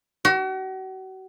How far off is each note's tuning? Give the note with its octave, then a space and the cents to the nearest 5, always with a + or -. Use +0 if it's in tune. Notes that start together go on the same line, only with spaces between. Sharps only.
F#4 +40